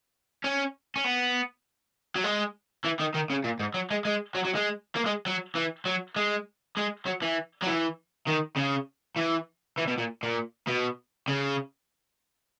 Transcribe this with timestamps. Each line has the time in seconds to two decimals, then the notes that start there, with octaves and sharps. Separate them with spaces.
0.44 C#4
0.96 C#4
1.04 B3
2.16 F#3
2.24 G#3
2.85 E3
3.00 D#3
3.15 D#3
3.30 C#3
3.44 A#2
3.60 G#2
3.74 F#3
3.91 G#3
4.05 G#3
4.35 F#3
4.45 F#3
4.55 G#3
4.96 A#3
5.06 G#3
5.26 F#3
5.55 E3
5.86 F#3
6.16 G#3
6.77 G#3
7.06 F#3
7.22 E3
7.62 F#3
7.67 E3
8.28 D#3
8.57 C#3
9.17 E3
9.78 E3
9.88 B2
9.98 A#2
10.23 A#2
10.68 B2
11.28 C#3